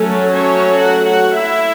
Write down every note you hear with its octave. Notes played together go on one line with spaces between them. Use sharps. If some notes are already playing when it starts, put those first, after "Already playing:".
Already playing: F#3 A3 C#4 A4
C#4 C#5
F#4 F#5
F#4 F#5
E4 E5